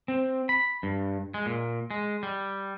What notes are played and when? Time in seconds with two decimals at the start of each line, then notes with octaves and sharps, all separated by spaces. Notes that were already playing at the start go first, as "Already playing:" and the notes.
0.08 C4
0.49 B5
0.83 G2
1.34 G#3
1.46 A#2
1.91 G#3
2.23 G3